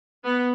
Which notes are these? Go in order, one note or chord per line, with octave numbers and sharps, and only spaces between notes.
B3